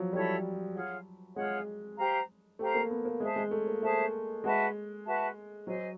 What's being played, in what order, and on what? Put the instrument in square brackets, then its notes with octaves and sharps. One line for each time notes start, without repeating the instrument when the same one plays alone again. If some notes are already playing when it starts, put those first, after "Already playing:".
Already playing: [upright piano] F3 F#3
[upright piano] G3 [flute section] E4 A4 C#5
[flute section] F4 G#4 C#5 F#5
[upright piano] G#3 [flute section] F4 G#4 C#5 F#5
[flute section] G4 C5 F5 A#5
[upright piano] A3 [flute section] G4 C5 F5 A#5
[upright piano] A#3
B3
A#3
[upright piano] G#3 [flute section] G#4 C5 E5 A5
[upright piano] G#3
A3
A#3
[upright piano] A3 [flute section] G#4 C5 E5 A5
[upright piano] G#3 [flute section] F#4 B4 E5 A5
[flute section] F#4 B4 E5 A5
[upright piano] F#3 [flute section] C5 D#5 G#5